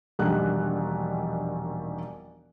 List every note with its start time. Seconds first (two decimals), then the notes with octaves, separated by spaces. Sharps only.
0.19 E1 A#1 D#3 G3 D4 F#6